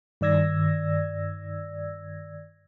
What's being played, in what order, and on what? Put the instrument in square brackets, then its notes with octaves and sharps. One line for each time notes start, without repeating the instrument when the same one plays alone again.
[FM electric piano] G2 D#3 D5 E6 G#6 A#6